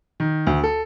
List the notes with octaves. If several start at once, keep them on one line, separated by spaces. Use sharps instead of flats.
D#3
D2
A4